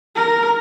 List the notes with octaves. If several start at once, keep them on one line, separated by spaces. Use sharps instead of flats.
A#4